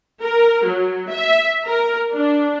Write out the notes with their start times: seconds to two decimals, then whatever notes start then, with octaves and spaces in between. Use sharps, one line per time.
0.23 A#4
0.65 F#3
1.11 E5
1.67 A#4
2.14 D4